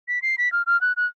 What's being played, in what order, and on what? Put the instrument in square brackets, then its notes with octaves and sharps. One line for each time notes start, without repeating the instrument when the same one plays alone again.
[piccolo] B6
C7
B6
F6
F6
F#6
F#6